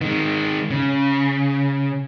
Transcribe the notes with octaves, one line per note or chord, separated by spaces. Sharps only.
D#3 G#3
C#3